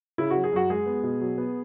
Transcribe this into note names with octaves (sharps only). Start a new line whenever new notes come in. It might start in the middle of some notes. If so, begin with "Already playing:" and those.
C#3 E4
F#4
F#3
G#4
F#2 F#4
G#3 G#4
B3
B2
F#3
B3